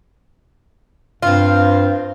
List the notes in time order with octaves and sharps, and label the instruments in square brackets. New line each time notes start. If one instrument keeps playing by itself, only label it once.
[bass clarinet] G2 [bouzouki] C4 F4